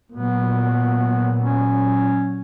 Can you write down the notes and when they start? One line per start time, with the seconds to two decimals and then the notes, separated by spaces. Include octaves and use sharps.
0.12 A#2 F#3 B3
1.42 C#4